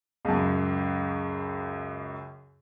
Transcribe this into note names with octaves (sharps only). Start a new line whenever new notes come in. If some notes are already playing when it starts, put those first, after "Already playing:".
C#2 F#2